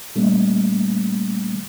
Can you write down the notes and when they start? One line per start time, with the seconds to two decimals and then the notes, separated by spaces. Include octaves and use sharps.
0.15 A#2 G3 A3 A#3 C#4